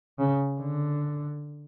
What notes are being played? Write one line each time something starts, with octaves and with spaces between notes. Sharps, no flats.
C#3
D3